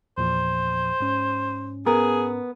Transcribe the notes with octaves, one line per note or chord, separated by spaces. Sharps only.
E2 A#2 F3 C5
G#2 C#4
B3 G#4 A#4